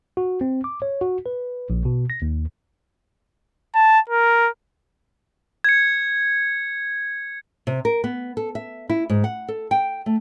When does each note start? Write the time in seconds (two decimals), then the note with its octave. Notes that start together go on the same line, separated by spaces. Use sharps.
0.17 F#4
0.41 C4
0.64 D6
0.82 C#5
1.01 F#4
1.26 B4
1.70 A#1
1.85 B2
2.10 A#6
2.22 D#2
3.75 A5
4.10 A#4
5.64 G#6 C#7
7.67 C3
7.85 A#4
8.04 B3
8.37 A4
8.55 E5
8.89 E4
9.09 G#2
9.24 F#5
9.48 A4
9.71 G5
10.06 A3